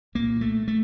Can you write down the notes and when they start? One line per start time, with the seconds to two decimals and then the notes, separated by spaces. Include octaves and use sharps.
0.15 C2 A#2 A#3
0.41 A3
0.68 A3